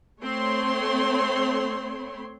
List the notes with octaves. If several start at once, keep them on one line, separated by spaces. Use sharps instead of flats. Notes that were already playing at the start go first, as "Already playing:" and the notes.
A3 C4 C#5 C6